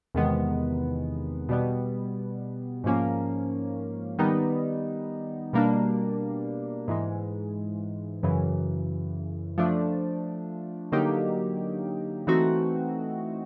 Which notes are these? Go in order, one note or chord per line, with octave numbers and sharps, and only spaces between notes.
E2 C3 D#3 G#3 B3
B2 G3 B3
G#2 F3 A#3 C#4
D#3 G3 B3 D#4
B2 G3 A#3 D4
G#2 E3 G#3
F#2 C#3 E3
F3 A3 D4
D3 F#3 A#3 D#4 G4
E3 A3 C4 D#4 F#4